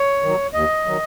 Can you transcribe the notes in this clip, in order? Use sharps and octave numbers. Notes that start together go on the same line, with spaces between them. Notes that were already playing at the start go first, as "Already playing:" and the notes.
Already playing: C#5
D#3 F#3
D#2 D#5
D#3 F#3